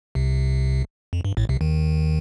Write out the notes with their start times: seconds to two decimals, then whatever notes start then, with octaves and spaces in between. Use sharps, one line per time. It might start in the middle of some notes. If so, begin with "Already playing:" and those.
0.15 C2 C3
1.13 F2
1.25 G2
1.37 A1 A2
1.49 C2 C3
1.61 D#2 D#3